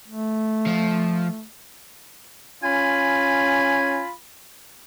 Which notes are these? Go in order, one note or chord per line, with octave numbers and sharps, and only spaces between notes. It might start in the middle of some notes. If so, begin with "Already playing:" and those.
A3
F3
C#4 F4 G#5 B5